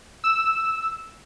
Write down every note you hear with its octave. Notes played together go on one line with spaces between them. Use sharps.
E6